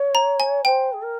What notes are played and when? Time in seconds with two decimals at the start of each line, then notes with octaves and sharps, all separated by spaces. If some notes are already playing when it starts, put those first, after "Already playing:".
Already playing: C#5
0.15 A#5
0.40 G#5
0.64 C5 G5
0.92 G#4
1.01 A#4